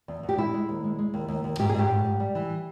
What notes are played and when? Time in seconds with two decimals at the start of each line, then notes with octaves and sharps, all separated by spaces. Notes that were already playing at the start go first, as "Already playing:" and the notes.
0.08 E2
0.23 E2
0.29 G4
0.38 G#3 E4
0.54 G#3
0.69 D#2
0.84 G#3
0.99 G#3
1.14 D#2
1.28 D#2
1.44 D#2
1.59 G#2 G4
1.69 G#4
1.75 G#2 G4
1.89 G#2
2.05 G#2
2.20 G3
2.35 E3